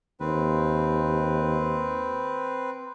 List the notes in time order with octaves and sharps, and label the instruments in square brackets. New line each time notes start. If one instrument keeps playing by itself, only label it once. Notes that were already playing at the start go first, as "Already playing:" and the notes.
[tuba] D#2 [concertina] C4 B4